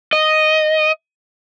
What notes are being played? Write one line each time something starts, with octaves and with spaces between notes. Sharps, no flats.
D#5